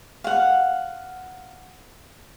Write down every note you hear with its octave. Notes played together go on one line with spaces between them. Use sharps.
F5 F#5